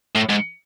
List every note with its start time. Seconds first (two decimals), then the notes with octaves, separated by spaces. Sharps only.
0.15 A2
0.29 G#2